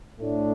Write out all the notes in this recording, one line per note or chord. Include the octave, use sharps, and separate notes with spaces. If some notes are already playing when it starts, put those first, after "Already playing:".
A2 A3 D4